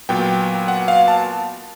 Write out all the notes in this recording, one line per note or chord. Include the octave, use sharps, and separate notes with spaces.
A#2 F#3 B3 G5
F#5
F5
A5